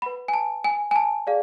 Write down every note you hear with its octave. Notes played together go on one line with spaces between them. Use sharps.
B4 F#5 B5
G#5
A5
G#5
G#5
A5
G#4 D5 F5